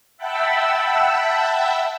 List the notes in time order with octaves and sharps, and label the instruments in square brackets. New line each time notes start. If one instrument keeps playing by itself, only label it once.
[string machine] E5 F#5 G5 A5 B5 E6